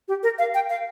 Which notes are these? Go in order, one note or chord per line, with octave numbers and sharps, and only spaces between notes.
G4
A#4
F5
G5
F5